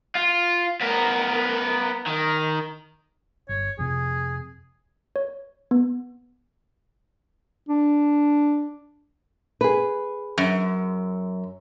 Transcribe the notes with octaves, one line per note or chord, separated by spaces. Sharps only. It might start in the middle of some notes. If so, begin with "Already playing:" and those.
F4
B3 A#4
D#3
G1 C#5
F2 C3 G#4
C#5
B3
D4
G#4 B4
F#2